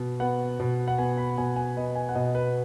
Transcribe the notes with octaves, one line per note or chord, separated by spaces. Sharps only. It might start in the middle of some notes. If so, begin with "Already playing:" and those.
Already playing: B2
B3 F#5
B2
F#5
B3 G#5
B5
B2 G#5
G#5
B3 D#5
G#5
F#5
B2 D#5
B4